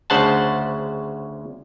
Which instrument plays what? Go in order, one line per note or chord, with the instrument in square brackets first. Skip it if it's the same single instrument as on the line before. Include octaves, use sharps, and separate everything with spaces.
[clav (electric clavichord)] D2 C#3 C5 F#5 A5